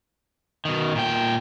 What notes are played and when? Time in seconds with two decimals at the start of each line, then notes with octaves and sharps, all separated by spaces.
0.65 B2 D#3
0.95 A#2 G5